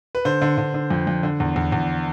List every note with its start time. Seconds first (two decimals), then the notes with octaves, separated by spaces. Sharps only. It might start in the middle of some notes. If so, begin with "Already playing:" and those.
0.15 B4
0.25 D3 C5
0.42 D3
0.58 D3
0.74 D3
0.90 F2
1.07 F2
1.23 D3
1.40 E2
1.56 E2
1.72 E2